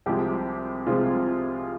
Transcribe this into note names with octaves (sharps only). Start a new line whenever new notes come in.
C2 C3 F3 G#3 G4
C2 C3 F3 G#3 F4 G#4